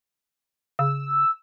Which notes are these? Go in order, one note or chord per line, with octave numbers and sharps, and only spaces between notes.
C#3 E6